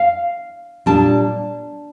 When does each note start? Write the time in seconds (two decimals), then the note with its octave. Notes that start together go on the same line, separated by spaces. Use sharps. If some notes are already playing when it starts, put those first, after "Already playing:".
Already playing: F5
0.86 A#2 G3 D4 A5